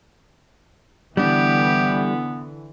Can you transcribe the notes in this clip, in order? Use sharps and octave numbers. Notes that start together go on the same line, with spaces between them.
D3 E3 G3 B3 D4 G4